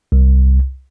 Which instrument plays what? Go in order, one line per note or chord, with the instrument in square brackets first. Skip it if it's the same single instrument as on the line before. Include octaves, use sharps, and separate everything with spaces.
[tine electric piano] C2